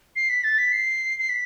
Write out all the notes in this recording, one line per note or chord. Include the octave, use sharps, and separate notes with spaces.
C7
B6
A6
B6
C7
C7
B6